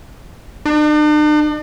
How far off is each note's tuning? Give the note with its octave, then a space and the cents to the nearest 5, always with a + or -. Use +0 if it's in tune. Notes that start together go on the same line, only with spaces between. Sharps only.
D4 +45